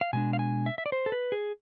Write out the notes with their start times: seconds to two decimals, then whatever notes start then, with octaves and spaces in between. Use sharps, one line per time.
0.01 F5
0.13 B2 G#3 D4 G#5
0.33 F5
0.39 G#5
0.66 E5
0.78 E5
0.86 D5
0.92 C5
1.06 A4
1.12 B4
1.32 G#4